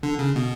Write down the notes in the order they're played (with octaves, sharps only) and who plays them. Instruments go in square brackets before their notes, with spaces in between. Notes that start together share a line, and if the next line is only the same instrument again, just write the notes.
[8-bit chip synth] D3
C#3
B2